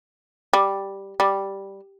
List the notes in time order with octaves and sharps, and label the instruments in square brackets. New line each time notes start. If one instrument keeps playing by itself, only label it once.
[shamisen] G3
G3